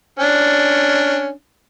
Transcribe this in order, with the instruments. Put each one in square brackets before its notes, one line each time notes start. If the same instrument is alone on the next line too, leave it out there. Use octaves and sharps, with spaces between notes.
[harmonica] C#4 D4